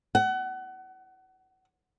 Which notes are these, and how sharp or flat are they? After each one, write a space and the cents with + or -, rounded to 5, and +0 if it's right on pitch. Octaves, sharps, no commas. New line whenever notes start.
F#5 +30